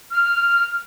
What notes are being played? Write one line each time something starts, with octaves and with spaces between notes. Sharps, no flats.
F6